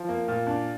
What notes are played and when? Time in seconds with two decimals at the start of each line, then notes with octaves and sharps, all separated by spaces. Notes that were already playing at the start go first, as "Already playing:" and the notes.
Already playing: F3
0.09 A#3
0.28 A#2
0.47 D4